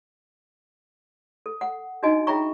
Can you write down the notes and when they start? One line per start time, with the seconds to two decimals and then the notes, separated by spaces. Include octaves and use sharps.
1.46 A4
1.61 F#5
2.03 D4 D#4 F#4 D#5 G#5
2.27 F4 G#4 E5 G5 A#5 C#6